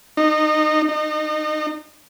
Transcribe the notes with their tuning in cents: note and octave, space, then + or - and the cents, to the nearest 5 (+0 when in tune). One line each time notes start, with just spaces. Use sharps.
D#4 -25
D#4 -30